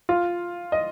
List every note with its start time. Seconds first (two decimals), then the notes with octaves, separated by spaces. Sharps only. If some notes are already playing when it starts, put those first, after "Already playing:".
0.09 F4
0.72 D#5